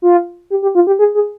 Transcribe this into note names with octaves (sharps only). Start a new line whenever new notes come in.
F4
G4
G4
F4
G4
G#4
G#4